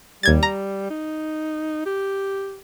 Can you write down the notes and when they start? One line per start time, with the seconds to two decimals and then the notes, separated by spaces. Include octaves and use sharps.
0.23 D#2 G3 G#6 A6
0.43 A#5
0.90 D#4
1.86 G4